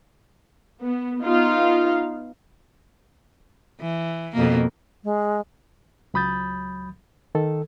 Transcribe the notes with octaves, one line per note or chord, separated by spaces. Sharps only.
B3
B3 D#4 F4 F5
E3
F2 B2 A#3
G#3
C#2 F#3 B5 D#6 G6 A6
D#3 A4